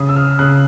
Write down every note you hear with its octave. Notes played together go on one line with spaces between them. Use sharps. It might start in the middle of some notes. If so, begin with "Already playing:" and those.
Already playing: C#3 D#6
E6
F6
C#3 F#6